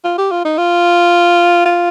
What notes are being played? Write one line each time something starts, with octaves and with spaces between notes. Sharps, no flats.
F4
G4
F4
D#4
F4
F4